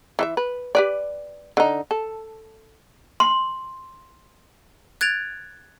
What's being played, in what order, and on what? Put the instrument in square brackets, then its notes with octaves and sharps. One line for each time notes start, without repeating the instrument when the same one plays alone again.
[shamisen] E3 E4 E5
B4
G4 B4 D5
D3 D#4
A4
[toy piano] C6
[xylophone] F#6 G#6 A6 D7 F7